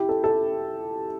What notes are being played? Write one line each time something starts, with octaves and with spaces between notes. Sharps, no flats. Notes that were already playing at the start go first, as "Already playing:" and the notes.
Already playing: E4 G4
A4
A4